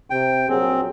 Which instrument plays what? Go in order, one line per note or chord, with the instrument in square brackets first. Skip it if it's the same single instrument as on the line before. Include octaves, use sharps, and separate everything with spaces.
[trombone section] C3 [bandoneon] G5
[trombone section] A#1 F#3 G#4 [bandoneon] C4